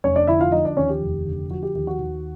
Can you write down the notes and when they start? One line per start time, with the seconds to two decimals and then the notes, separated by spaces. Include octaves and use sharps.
0.04 F1 C#4 C#5
0.15 D4 D5
0.27 D3 E4 E5
0.40 F4 F5
0.52 F3 D#4 D#5
0.65 D4 D5
0.76 D#2 C#4 C#5
0.89 G4
1.01 F1
1.26 D3
1.50 F3 F#4
1.63 G4
1.74 D#2 G4
1.87 F#4
1.99 D#2